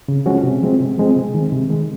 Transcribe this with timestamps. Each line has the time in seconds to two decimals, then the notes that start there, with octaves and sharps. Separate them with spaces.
0.08 C#3
0.26 F3 G#3 C#4 F#4
0.43 C3
0.62 F3 G#3 C4
0.80 C3
0.98 F3 G#3 C4
1.16 C3
1.34 D#3 G#3
1.52 C3
1.70 D#3 G#3